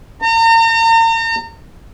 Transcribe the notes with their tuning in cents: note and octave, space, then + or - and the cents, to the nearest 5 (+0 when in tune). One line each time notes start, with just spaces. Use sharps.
A#5 -40